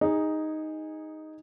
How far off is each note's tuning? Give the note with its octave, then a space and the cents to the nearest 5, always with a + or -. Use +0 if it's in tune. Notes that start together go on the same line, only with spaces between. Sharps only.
D#4 +0 G#4 -20